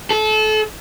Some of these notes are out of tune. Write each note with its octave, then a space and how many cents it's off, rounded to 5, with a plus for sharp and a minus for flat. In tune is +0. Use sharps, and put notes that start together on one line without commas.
A4 -30